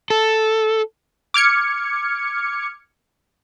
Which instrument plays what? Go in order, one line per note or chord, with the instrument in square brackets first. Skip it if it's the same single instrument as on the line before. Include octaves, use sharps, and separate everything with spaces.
[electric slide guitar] A4
[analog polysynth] D6 F6 G#6 C#7